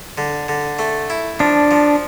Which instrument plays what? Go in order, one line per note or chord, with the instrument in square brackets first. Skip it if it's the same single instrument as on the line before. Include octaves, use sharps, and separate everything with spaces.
[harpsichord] D3
D3
A3
E4
[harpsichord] F3 [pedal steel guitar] D4
[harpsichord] F3